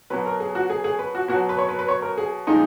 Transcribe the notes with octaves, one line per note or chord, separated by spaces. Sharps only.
B2 F#3 B4
A#4
G#4
F#4
G#4
G#4
B4
F#4
B2 F#3 F#4
B4
C#5
B4
B4
C#5
A#4
G#4
A#2 F3 G#3 D#4